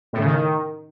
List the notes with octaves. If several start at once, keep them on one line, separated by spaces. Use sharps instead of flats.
A2
C#3
D#3